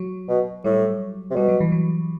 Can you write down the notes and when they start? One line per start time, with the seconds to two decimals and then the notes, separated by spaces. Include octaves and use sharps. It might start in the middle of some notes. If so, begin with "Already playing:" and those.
Already playing: F#3
0.29 B2
0.64 A2 G3
1.31 C3
1.36 B2 G3
1.48 F#3
1.60 E3
1.72 F#3